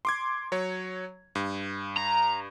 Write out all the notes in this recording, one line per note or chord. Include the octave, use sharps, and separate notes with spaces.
C6 D6 G#6
F#3 C#5
G2
A#5